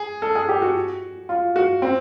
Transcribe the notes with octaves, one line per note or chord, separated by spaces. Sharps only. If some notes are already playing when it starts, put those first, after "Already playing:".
Already playing: G#4
A4
G#4
G4
F#4
F4
F#4
C4